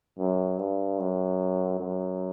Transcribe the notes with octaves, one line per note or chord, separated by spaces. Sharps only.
F#2
G2
F#2
F#2